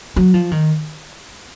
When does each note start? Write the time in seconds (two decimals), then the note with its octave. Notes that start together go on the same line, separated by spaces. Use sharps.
0.16 F#3
0.34 F3
0.51 D#3